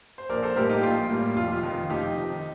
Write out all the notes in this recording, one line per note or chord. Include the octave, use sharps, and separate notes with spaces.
C5
A#1 A#4 D5
A4 C5
A2 G3 A#3 G4 A#4
D#4 G4
A#1 F4
A2 G3 A#3
F1 F4
G4
F4
F2 D#3
F1 D#4 G4
F2 D#3